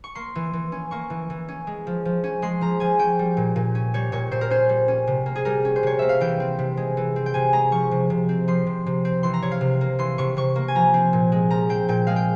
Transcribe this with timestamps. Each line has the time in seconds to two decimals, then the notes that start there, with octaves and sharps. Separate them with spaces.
0.04 C#6
0.15 A#3 C6
0.35 E3
0.53 E3
0.72 C#4
0.91 A#3 C#6
1.10 E3
1.30 E3
1.48 C#4
1.67 G#3
1.87 F3
2.05 F3
2.24 C#4
2.42 G#3 C6
2.61 F3 A#5
2.80 F3 G#5
2.99 C#4 G5
3.19 G3
3.37 A#2
3.56 A#2
3.75 C#4
3.94 G3 C#5
4.12 A#2 C#5
4.31 A#2 C5
4.41 A#4
4.50 C#4 C5
4.69 G3
4.88 C#4
5.07 C3
5.26 A#3
5.35 G#4
5.45 G3 A#4
5.65 C#4
5.76 C5
5.83 C3 C#5
5.99 A#3 E5
6.09 F5
6.21 E3 G5
6.40 C4
6.59 C3
6.77 G#3
6.97 E3
7.16 C4
7.26 G5
7.34 C3 G#5
7.53 G#3 A#5
7.72 F3 C#6
7.91 C3
8.10 C3
8.29 C4
8.48 F3 C6
8.66 C3
8.86 C3
9.05 C4
9.23 E3 C6
9.34 A#5
9.42 C3 C#5
9.51 F5
9.61 C3
9.81 A#3
9.99 E3 C6
10.18 C3 C#6
10.37 C3 C#6
10.56 A#3
10.68 G#5
10.75 F3 A#5
10.94 C4
11.13 A#2
11.32 G#3
11.51 F3 A#5
11.69 C4 G5
11.88 A#2 G5
12.07 G#3 F5
12.16 G5